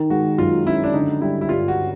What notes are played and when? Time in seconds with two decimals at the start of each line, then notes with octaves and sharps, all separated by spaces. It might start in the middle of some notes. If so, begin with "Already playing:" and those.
Already playing: D#3
0.10 G#3 F#4
0.38 F#2 F4
0.66 C#4 E4
0.84 D4
0.94 D3 D#4
1.21 G3 E4
1.41 E4
1.49 G2 F4
1.68 F#4